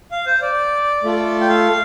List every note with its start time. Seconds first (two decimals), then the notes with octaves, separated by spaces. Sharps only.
0.11 F5
0.26 C5
0.42 D5
1.03 A3 F4 A4
1.41 G5
1.49 F5